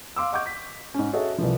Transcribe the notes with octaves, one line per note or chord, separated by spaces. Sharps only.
F5 C6 D6 E6
D#5 F#5 C#6 D6 G6
B6
G#2 C#4
F#4 G#4 A4 C#5 D#5 E5
C2 E3 F3